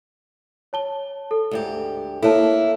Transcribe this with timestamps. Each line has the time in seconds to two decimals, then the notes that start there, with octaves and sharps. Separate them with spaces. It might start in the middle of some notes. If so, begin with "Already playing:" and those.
0.73 C#5 A5 G7
1.31 A4
1.51 D2 G#2 G4
2.22 A#3 E4 A4 C#5 A5